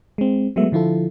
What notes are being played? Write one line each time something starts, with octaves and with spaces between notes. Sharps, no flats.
G#3 C4
F#3 G#3 A3 B3 E5
D3 F3 E4 F4 A4